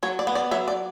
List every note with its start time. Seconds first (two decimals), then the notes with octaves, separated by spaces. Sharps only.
0.03 F#3 C#5
0.19 D5
0.27 B3
0.35 D5
0.51 F#3 E5
0.68 D5